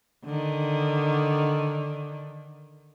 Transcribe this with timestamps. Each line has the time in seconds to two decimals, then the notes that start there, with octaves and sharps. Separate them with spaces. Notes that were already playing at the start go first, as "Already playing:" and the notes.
0.25 D3 D#3